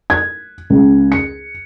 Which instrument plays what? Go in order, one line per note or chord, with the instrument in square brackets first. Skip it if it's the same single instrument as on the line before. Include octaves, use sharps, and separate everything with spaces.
[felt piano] G#6
C#2
C#7